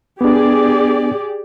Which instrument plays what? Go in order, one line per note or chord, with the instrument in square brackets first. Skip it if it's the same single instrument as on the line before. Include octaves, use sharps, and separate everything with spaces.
[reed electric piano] B3 D4 [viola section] G4 G#4 D5